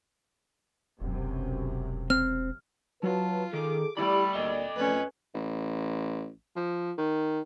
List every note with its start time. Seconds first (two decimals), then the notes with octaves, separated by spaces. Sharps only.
1.00 E1 B1 F#2 C3
2.10 C4 F6
3.03 F#3 F4 B4 A5
3.53 D#3 G#4 A4 D6
3.97 G3 A3 E4 G4 D5 B5
4.35 D2 A#2 A4 D#5
4.76 F2 A3 C#4 B4
5.34 A1
6.56 F3
6.98 D#3